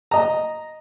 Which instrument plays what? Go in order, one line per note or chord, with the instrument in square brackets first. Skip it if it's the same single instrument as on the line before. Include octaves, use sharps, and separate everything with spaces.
[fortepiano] D#5 A#5